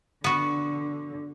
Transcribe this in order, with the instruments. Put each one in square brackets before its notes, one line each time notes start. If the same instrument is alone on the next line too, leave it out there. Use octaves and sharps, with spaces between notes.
[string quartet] D3 [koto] B3 F#4